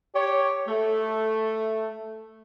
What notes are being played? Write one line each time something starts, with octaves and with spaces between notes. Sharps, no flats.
G4 C#5
A3